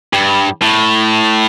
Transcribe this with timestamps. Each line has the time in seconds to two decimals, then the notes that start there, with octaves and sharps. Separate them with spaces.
0.13 G2
0.62 A2